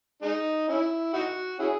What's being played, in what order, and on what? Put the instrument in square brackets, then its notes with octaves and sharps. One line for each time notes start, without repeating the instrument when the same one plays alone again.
[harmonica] G#3 D#4
C#4 E4
D#4 F#4
C#4 E4 G#4